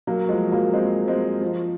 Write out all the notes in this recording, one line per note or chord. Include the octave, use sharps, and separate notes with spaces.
F#3 A#3
F3 G#3
F#3 A#3
G#3 C4
G#3 C4
F3